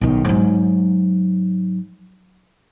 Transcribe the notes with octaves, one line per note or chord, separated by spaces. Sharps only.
B1 D#3
G#2 F#3